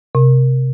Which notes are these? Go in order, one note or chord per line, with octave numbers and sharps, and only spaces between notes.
C3